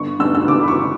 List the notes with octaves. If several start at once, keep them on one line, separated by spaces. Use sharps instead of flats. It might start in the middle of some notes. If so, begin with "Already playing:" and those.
Already playing: G1 C#6
G1 E6
E6
G1 D6
B5
C#6